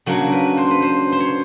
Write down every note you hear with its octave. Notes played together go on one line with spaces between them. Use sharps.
C#3 F#3 A#3 D4 A#4
B4
C5
B4
C5
C5
C#5